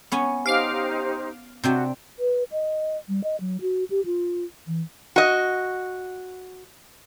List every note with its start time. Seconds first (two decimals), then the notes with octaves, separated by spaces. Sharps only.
0.12 B3 C#4 G#5
0.46 D#4 G4 C5 F5 D6 F6
1.64 C3 D4 F#4 G5
2.19 B4
2.52 D#5
3.09 G3
3.24 D#5
3.41 F#3
3.61 F#4
3.90 G4
4.05 F4
4.67 E3
5.16 F#4 D#5